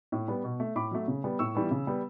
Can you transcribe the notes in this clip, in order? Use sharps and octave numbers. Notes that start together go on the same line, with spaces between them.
A2
G3 B3
B2
A3
A2 B5 D6
F#3 A3
C#3
G3 B3
A2 C#6 E6
E3 G3 B3
C#3
G3 B3